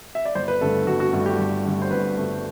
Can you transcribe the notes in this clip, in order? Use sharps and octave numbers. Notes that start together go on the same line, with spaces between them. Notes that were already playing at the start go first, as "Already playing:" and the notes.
E5
D5
G1 C5
B4
G2 D3 A3 A4
G1 F#4
F#4
G2 D3 A3
G4
G1
G2 D3 A3
C5
G1 B4
G2 D3 A3